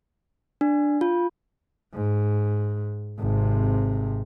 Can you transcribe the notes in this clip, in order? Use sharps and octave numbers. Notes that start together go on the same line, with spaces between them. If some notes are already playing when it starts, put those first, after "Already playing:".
D4
F4
G#2
G#1 C3